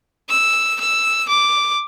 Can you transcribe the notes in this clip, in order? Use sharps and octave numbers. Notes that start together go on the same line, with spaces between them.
E6
E6
D6